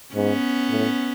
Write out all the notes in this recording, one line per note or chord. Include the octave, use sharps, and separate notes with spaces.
G#2 B3 C#4
A2